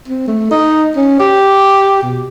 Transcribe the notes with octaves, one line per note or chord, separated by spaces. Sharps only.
C4
A3
D#4
C#4
G4
B2